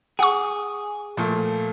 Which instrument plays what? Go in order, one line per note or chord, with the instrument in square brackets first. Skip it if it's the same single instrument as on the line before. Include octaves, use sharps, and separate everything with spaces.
[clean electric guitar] G#4 [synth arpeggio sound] F#5 C#6
[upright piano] A#2 F3 A3